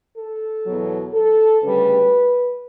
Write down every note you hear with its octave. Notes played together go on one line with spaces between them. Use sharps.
A4
E2 B2 F#3
A4
D2 C#3 G3 B4